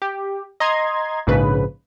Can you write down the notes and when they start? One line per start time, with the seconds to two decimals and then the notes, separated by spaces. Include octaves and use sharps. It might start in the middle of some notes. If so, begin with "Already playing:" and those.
0.02 G4
0.60 D#5 A#5 C6 G#6
1.27 A#1 G#2 C#3 B4